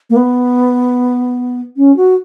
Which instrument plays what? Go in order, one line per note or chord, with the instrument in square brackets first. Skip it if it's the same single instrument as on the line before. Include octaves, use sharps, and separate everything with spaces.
[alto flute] A#3
B3
C#4
F#4